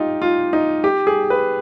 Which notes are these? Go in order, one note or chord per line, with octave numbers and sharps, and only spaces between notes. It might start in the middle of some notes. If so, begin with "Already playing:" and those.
Already playing: D#4 F4 G4
F4
D#4
G4
G#4
B4